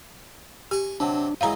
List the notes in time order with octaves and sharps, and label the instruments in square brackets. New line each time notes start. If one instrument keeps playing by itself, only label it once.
[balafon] G4 [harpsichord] G#5 C#6
[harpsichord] C3 F#3 [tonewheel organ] D4
[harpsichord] F#2 E3 G#3 [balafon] F5 A#5